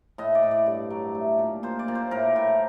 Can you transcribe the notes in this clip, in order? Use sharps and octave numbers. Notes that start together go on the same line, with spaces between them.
A2 D#5
D5
A2
D5
G2
F#3
A3
A#2
A#2 C5
D5
A#2
C5
A2 A#4
A2